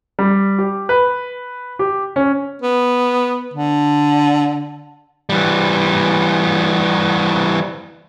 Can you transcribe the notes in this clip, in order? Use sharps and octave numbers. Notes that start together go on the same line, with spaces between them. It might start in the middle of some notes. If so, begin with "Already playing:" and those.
G3
G4
B4
G4
C#4
B3
D3
E3 G3